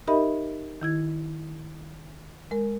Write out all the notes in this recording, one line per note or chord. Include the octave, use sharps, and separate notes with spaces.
D#4 G4 A#4 D#5 E5 B5
D#3 E4 G#6
G#3 A#4